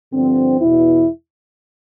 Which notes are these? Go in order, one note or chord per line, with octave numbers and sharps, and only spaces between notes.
G2 D3 F3 C4
E2 B2 E4